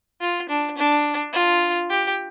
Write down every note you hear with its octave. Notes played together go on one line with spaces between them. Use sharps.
F4
D4
D4
F4
G4